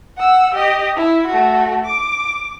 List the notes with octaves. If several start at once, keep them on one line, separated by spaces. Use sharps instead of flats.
F#5 E6
G4 D#5
E4
A3 F#4
D6